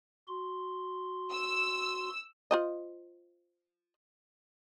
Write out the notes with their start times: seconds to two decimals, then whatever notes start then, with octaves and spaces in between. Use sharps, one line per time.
0.28 F#4 C6
1.31 E6
2.51 F4 C5 D#5